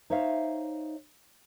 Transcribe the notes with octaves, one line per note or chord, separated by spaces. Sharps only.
D#4 C5 C#5 E5 F5